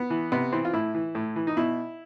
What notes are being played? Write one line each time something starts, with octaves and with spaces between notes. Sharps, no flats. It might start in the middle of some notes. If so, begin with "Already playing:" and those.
Already playing: B3
E3
C3 B3
E3 C4
F4
A2 E4
E3
A2
E3
D#4
B2 E4